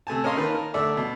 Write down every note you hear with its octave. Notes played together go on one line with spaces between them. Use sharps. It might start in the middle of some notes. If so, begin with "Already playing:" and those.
C3 A3 G#5 A5
C#4 A#4 D#5 F5 C6
D#3 A#3 F4 B4 A5
A#4
D2 A3 D5 E5
B2